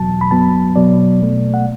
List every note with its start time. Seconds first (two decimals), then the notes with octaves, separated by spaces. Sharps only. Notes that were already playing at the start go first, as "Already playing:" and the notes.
Already playing: E2 B2 F#3 A5
0.21 B5
0.31 F#2 F#3 B3 A5
0.76 B2 F#3 B3 D5
1.20 B2 A3
1.54 F#5